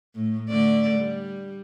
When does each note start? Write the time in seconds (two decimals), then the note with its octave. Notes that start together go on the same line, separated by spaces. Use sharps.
0.15 A2
0.49 D3 A3 D5
0.97 G3